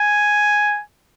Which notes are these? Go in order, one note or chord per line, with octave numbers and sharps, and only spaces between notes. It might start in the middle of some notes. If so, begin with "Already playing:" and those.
Already playing: G#5